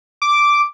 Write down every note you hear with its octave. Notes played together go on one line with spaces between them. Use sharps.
D6